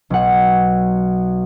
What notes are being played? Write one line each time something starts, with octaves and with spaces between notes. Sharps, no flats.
B1 F#5